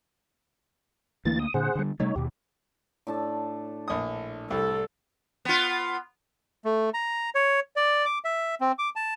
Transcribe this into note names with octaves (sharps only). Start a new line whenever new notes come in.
D2 E3 A#3 A6
D#6
A#2 D3 G#4 C5 F#5
D3 G3
C3 G3 A3 D#4 C#5
D#2 B2 G4
A2 D4 A5
A#1 D#6
C2 A4
B3 F4
A3
A#5
C#5
D5
D6
E5
C4
D6
A5